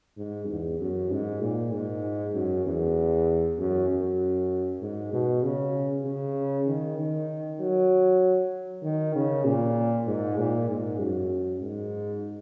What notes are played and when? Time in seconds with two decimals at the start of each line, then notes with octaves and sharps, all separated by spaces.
0.17 G#2
0.48 E2
0.80 F#2
1.11 G#2
1.41 A#2
1.72 G#2
2.34 F#2
2.65 E2
3.58 F#2
3.88 F#2
4.82 G#2
5.13 B2
5.43 C#3
6.05 C#3
6.66 D#3
6.97 D#3
7.60 F#3
8.83 D#3
9.15 C#3
9.45 A#2
10.07 G#2
10.38 A#2
10.69 G#2
11.00 F#2
11.62 G#2